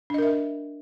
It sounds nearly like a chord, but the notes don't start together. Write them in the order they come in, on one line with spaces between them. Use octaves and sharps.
D4 D#5 A#4 E5